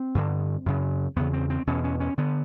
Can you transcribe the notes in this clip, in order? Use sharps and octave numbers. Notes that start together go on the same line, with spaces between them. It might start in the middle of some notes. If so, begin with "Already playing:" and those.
Already playing: C4
G2 D3
F#2 C#3
E2 C#3 B3
C4
C4
E2 B2 C#4
C#4
C#4
D3 B3